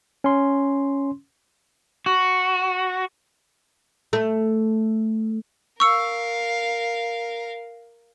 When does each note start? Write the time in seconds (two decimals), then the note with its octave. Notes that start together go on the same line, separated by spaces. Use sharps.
0.24 C#4 C6
2.06 F#4
4.13 A3
5.80 A#4 F5 C#6 E6 C#7